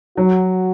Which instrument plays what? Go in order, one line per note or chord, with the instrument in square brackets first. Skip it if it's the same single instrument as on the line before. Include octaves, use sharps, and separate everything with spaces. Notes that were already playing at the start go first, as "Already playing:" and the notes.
[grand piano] F#3 [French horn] F#4